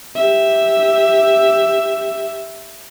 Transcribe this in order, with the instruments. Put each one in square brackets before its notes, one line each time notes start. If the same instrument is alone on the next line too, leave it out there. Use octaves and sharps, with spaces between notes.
[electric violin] G4 E5